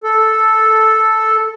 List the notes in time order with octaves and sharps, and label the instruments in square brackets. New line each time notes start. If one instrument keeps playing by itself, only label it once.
[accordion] A4